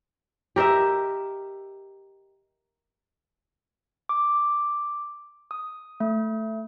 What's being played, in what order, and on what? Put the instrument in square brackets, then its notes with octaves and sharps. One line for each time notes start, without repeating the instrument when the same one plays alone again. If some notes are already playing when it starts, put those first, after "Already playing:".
[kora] G4 A#4 D#5 E5
[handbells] D6
D#6
A3